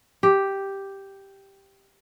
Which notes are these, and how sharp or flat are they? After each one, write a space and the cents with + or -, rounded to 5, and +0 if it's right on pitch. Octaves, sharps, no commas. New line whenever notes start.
G4 +0